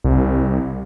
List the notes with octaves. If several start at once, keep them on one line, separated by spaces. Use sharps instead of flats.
C2